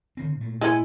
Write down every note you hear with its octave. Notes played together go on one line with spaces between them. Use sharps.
D3 D#3 C4
A#2 A3
G#3 C#4 E4